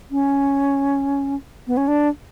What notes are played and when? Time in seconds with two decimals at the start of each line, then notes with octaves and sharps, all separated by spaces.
0.11 C#4
1.67 B3
1.77 C#4
1.88 D4